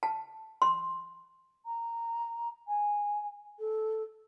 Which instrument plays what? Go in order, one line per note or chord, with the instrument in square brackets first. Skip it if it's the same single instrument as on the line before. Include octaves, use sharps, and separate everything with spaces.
[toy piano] A5
C6
[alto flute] A#5
G#5
A4